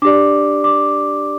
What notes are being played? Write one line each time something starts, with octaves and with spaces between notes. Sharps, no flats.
D4 G4 D5 D6
D6